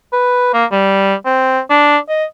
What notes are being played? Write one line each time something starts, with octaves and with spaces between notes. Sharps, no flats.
B4
A#3
G3
C4
D4
D#5